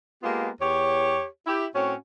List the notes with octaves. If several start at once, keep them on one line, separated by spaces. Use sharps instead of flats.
G#3 A#3 B3 F4 G4
E2 G4 C#5
E4 G4
A2 C4 C#4 F#4 C#5